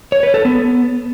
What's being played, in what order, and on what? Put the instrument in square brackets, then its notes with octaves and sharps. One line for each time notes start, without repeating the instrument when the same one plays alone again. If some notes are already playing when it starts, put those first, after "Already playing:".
[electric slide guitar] C#5
B4
A4
B3